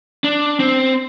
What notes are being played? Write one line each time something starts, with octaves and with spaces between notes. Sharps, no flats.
D4
C4